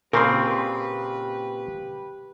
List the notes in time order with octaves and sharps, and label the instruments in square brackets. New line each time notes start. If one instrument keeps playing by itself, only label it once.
[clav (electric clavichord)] A#2 C#3 C4 [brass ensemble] G4 B4 [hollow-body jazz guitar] A#4 C6